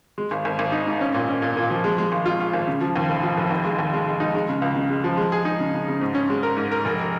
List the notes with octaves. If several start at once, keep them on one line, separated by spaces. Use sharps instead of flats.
G#3
G#1
G#1
G#1
D#4
G#2
C#4
A#2
C#4
A#2
A#2
F3
G#3
G#3
G#1
F4
F4
G#1
C#3
F3
D#2
F1
F3
F1
D#2
G#3
D#2
G#3
G#3
D#4
G#3
C#3
C#2
C#3
G#3
F3
G#3
G#4
D#4
C#3
C#3
C#3
G#2
C#4
G#3
A#4
G#2
A#4
F1